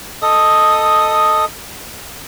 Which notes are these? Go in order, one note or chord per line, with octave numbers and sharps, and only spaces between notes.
A4 D#5 D#6